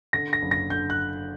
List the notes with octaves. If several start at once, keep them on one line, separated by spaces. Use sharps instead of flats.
D3 A#6
A#6
F#1
A#6
D3 G6
F#6